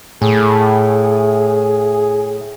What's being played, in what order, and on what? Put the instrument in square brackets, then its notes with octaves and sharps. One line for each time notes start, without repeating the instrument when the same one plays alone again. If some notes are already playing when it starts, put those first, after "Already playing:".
[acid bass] A2 [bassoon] G#4